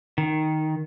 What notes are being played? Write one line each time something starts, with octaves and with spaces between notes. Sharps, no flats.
D#3